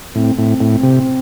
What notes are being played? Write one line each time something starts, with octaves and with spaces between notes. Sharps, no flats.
A2 C4
A2 C4
A2
C3